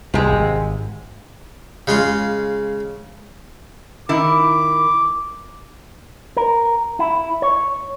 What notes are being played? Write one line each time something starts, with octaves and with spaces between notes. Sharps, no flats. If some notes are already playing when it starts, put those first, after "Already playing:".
C2 C3 G#3
G#1
C#3 G#3 F4
D#3 E4 D6
A#4
E4
C#5